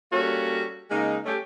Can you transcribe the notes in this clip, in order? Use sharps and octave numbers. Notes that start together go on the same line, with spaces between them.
G3 A#3 C#4 F#4 A4 C#5
C#3 G#3 A#3 D#4
A3 C#4 G4